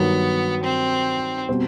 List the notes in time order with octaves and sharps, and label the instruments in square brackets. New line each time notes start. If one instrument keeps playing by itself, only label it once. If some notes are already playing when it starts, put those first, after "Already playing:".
Already playing: [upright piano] G2 D#3 F#3 [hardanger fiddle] B3
[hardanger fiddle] C4
[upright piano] B2 G3 C4